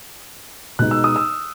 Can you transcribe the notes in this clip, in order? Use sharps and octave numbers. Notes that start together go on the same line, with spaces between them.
B2 G#3 D#4 F#6
E6
D#6
E6